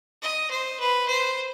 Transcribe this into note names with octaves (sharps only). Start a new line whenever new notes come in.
D#5
C5
B4
C5